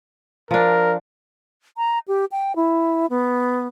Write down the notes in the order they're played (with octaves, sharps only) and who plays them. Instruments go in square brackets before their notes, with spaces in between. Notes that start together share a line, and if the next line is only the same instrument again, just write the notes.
[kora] F3 D4 [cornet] A#4
[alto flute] A#5
G4
G5
E4
B3